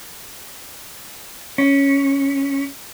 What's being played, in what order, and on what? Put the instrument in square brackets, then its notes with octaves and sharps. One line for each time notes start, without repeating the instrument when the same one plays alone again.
[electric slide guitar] C#4